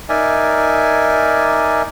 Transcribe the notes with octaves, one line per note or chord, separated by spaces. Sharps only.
D#4 A#4 D5 E5 G#5